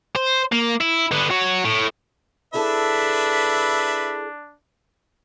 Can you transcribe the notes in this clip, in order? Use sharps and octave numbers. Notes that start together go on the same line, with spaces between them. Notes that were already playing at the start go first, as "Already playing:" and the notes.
C5
A#3
E4
D3 B3
F#4 C#5
A2
D4 E4 G#4 A4 B4 E5